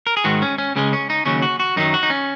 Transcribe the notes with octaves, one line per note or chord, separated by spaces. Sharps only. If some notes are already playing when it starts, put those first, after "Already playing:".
A#4
G#4
G#2 D#3 G#3 F#4
C#4
C#4
C#2 C#3 G#3 C#4
C#4
D#4
D#2 C#3 F#3 C#4
F#4
F#4
F#2 D#3 F#3 D#4
F#4
D#4
C#4